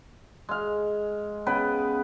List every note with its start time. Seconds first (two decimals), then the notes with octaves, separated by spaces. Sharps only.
0.49 G#3 F5
1.46 C#3 B3 B4 G5